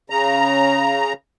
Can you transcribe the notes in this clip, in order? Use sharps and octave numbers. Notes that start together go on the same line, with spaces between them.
C#3 A#5